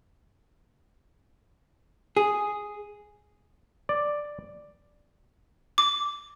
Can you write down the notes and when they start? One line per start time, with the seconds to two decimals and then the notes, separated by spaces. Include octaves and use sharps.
2.17 G#4
3.89 D5
5.78 D6